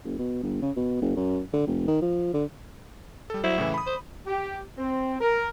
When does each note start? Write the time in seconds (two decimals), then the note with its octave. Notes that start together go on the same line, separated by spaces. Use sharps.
0.05 F#1
0.19 B2
0.43 G1
0.62 C#3
0.76 B2
1.01 F#1
1.16 F#2
1.53 D3
1.67 F1
1.87 D#3
2.02 F3
2.34 D3
3.30 G3 A4
3.44 F#3 E4 C5
3.58 A2 C#3 E3
3.74 B5 D#6
3.87 C5
4.27 G4
4.78 C4
5.21 A#4